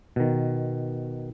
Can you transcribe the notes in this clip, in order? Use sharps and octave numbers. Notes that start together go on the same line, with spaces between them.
B2 D#3